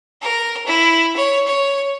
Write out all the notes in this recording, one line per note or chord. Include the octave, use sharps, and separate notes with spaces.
A#4
E4
C#5
C#5